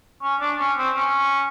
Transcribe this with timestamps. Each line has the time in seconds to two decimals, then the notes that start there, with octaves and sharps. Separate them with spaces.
0.22 C#4
0.41 D4
0.59 C#4
0.77 C4
0.95 C#4